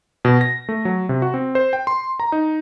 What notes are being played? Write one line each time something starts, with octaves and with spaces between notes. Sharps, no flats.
B2
A#6
A3
F#3
C3
F#4
C4
C5
G5
C6
A#5
D#4